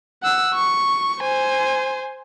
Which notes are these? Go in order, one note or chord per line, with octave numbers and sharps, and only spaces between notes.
F#5 E6
C#6
C5 G#5